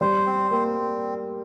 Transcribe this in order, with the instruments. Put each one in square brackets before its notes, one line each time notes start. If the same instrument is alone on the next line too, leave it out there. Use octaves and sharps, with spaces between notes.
[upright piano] G3 [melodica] C5
[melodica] C4
[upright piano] A#3 [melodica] C4